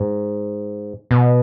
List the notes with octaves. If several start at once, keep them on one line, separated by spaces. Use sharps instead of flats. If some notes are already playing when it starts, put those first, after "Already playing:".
Already playing: G#2
B2